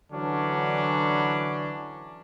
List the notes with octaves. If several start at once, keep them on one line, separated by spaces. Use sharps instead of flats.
D3 E3 F#3 C#4 D4